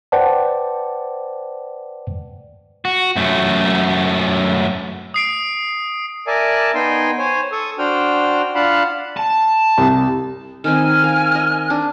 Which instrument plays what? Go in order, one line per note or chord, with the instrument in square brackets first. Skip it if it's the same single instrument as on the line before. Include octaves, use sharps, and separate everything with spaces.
[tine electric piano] B4 C5 D5 F#5 G5 A5
[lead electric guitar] F#4
F#2 A3
[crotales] D#6 C7 D7
[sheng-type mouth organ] A#4 D5 E5 G#5 A5
B3 D#4 G5 G#5 C6
C5 C#5 G#5
A4 C#6 D#6
D4 F#4 C5 G5 F6
D4 F4 F5 F#5 A5 B5
[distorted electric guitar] A5
[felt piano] C2
[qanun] D#3 C4 D#4 [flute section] G#5 F6
[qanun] A#4 F5
D#5
D4